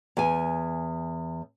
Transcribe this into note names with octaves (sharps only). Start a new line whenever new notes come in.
E2 G#5